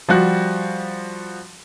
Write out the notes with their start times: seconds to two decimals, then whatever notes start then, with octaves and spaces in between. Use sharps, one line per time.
0.09 F3 G3 F#4 F#6